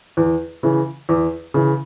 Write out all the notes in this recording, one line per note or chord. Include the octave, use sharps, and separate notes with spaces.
E2
C#3 E3
E2
C#3 E3